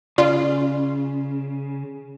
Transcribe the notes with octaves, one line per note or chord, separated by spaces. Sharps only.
C#3 F4 D5